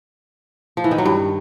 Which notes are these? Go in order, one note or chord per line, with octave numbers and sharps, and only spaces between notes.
F3
E3
D#3
F#3
G2